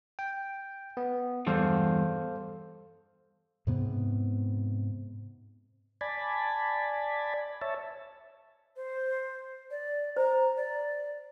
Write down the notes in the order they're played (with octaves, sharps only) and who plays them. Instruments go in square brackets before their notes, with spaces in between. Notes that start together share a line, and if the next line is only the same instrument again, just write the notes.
[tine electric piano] G5
B3
[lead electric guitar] E2 G2 [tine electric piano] A4 C5 F5
[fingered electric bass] G#2 C3 B3
[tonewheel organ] D5 G#5 A5 B5
C#5 E5 A5
[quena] C5
D5
[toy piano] C5 [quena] A#5
[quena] D5